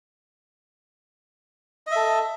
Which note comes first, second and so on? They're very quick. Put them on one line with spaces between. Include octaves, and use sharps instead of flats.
D#5 E5 A4